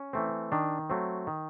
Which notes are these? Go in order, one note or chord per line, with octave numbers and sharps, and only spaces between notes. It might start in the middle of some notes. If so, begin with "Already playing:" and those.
Already playing: C#4
E3 A3 C4
D#3 D4
F#3 A3 C4
D#3